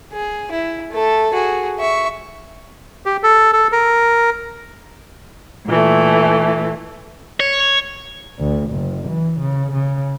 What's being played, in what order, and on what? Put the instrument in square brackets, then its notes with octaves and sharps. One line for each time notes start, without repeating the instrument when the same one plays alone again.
[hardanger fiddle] G#4
E4
A3 A4
F#4 G#4
E5 C#6
[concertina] G4
A4
A4
A#4
[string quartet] A#2 E3 A3
[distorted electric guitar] C#5
[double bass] D2
F#1
E3
C#3
C#3